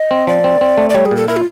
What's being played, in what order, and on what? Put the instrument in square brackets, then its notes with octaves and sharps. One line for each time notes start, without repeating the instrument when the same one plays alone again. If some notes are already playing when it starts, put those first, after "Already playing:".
Already playing: [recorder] D#5
[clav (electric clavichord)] C4
[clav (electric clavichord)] F3 [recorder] D5
[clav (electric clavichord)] C4
C4
A3
[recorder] D5
[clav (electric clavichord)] G3 [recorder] C#5
[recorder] G#4
[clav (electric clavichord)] A#2
[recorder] A4
[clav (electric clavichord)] E4 [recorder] A#4
[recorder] F4